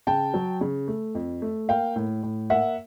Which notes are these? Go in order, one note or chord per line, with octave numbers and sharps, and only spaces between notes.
C#3 G5 A5
F#3
C#3
A3
F2
A3
A#3 F5 G5
A2
A2
A#3 E5 F#5